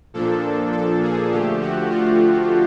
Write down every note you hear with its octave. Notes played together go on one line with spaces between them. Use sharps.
A#2 F3 A#3 D4 A4
A4
G#4
D3 F3 A3 G4
F#4
F4